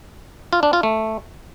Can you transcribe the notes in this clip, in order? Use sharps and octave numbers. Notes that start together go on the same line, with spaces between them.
F4
D4
F4
A3